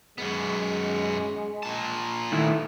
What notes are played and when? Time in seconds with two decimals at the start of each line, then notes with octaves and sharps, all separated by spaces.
0.18 F#2 G#3 B3
1.63 A#2 A5
2.32 D#3 A3 E4